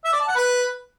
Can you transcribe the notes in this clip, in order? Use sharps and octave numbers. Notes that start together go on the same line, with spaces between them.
E5
D5
A5
F#5
B4